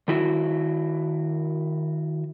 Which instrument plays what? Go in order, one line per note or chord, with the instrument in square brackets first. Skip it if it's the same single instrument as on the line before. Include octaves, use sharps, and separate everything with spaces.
[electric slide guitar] D#3 E4 F#4